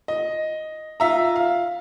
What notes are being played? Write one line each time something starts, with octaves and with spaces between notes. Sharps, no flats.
D#5
F4 E5 A#5
F5